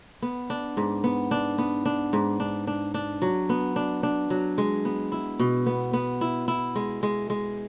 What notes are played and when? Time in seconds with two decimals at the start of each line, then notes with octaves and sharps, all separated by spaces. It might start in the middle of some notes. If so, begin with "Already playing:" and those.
0.22 B3
0.50 D4
0.77 G#2
1.04 B3
1.31 D4
1.58 B3
1.85 D4
2.13 G#2
2.40 D4
2.67 D4
2.94 D4
3.22 F#3
3.49 B3
3.76 D4
4.03 D4
4.30 F#3
4.58 G#3
4.85 B3
5.12 E4
5.39 B2
5.66 B3
5.93 B3
6.21 E4
6.48 E4
6.75 G#3
7.03 G#3
7.30 G#3